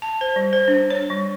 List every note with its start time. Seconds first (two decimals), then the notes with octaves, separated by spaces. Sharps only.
0.02 A5
0.21 C5
0.36 G3
0.53 C5
0.68 D4
0.90 C#5
1.10 G3